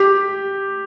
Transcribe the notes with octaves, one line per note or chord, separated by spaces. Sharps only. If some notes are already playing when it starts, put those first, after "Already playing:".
Already playing: G4